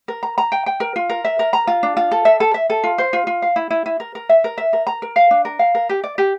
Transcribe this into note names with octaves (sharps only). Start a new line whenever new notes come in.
A#4
A#5
A#5
G5
G5
A#4
F4
A#4
E5
A#4
A#5
F4
D4
F4
A4
E5
A4
E5
A4
F4
C5
F4
F4
F5
E4
E4
E4
A#4
A#4
E5
A#4
E5
A#4
A#5
A#4
F5
D4
A#4
F5
A#4
G4
D5
G4